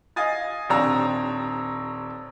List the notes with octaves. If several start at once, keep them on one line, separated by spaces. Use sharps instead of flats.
D#5 F5 G#5 D#6 A6
D#1 C4 D4 C#5 A#5 E6